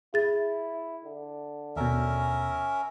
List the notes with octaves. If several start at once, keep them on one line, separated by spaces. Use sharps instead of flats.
E4 G#4 A6
D3
D#2 B2 C#4 A#4 E5